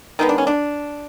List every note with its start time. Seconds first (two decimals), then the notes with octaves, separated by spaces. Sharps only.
0.19 D#3 G#3 B3 D#4
0.29 D4
0.38 C#4
0.47 D4